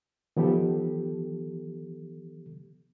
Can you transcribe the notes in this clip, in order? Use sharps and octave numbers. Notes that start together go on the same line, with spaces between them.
D#3 F3 B3 G4 A4